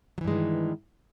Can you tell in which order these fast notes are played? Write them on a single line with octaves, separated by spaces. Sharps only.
F#3 E3 G2 G#3 D#3